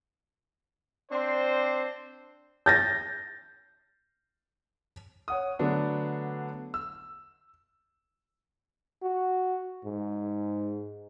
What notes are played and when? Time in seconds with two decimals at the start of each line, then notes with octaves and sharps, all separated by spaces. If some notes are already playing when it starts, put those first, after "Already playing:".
1.11 C4 D4 C5
2.66 G6 A6 A#6
5.28 C#5 F#5 D#6
5.59 D3 F#3 A3 B3 D4
6.74 E6
9.03 F#4
9.84 G#2